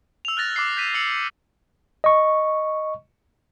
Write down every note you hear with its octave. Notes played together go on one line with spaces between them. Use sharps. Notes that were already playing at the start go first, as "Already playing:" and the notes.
E6 F7
F6 F#6 A6 A#6
D6 E6 F#6 C7
G6 B6 D#7
E6 C#7 F#7
C#7
D#5 C#6